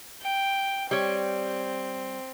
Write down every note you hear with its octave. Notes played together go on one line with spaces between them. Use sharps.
G5
G3 C4 C#5